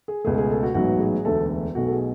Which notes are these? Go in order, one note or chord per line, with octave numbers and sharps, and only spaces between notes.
G#4
C#2 B2 A3 G#4
G#4
A4
F#4
A1 G#2 F#3 B3 F#4
G#4
E1 D2 D3 A3 A4
B1 B2 A3 F#4
A4
G#4